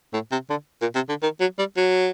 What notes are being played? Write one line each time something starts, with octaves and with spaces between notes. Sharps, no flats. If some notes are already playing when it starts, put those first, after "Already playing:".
A2
C3
D3
A#2
C3
D3
D#3
F#3
G3
F#3